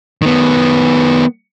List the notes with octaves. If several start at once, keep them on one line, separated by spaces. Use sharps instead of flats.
D#3 B3